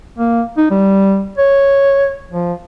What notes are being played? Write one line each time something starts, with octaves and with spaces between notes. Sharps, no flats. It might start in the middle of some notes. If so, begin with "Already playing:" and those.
A#3
D#4
G3
C#5
F3